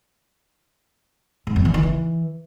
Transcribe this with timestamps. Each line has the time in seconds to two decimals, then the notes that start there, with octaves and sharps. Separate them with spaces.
1.47 G#2
1.56 F2
1.65 E2
1.74 D#3
1.83 E3